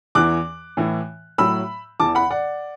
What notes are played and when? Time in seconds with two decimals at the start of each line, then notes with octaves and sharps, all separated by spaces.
0.15 E2 E3 D6 F#6
0.77 A2 E3
1.38 A2 F#3 B5 E6
2.00 E2 E3 A5 D6
2.15 F#5 B5
2.30 D5 F#5